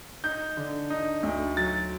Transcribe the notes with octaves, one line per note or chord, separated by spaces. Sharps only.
D#4 G6
D3
D#4
D2
F#3 A6